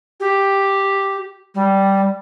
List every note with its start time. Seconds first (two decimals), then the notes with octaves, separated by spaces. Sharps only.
0.20 G4
1.54 G3